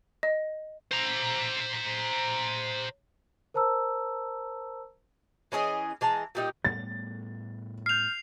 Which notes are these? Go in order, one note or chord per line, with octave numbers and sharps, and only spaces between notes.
D#5
C5 A#5
A#4 C5 A5 A#5 E6
E3 C#4 G#4 D#5
E3 G#3 A5 A#5
A#2 G3 D#4 G5
A2 G3 B3 A6
F6 G6 C7 F7